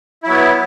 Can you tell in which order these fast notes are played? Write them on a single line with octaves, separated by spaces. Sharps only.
E4 F#3 B3